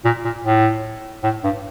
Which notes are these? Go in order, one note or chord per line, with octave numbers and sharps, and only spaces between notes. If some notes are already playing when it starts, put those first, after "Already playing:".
A#2
A#2
A2
A2
G2